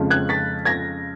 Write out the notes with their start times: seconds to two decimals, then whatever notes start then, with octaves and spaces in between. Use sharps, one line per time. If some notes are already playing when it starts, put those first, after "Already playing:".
Already playing: F2 C#3 F3 G#3
0.10 F#6 G#6
0.29 A6 B6
0.65 G#6 A#6